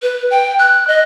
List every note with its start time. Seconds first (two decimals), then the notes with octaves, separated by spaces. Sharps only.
0.02 B4
0.31 G5
0.59 F#6
0.88 D#5